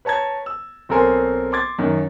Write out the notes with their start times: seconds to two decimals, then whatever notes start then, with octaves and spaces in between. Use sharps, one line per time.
0.05 B4 C#5 A5 A#5 G#6
0.46 E6
0.89 B1 C4 A4 A#4 G#5 C6
1.52 C6 D6 G#6 A6
1.78 F#2 D#3